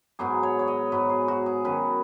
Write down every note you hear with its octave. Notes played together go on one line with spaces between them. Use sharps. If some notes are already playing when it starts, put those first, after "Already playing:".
G#2 F#3 B3 G#4
C#5
C#5
D#5
G#2 F#3 B3 B4
G#4
F#4
G#4
D#3 F#3 C#4 B4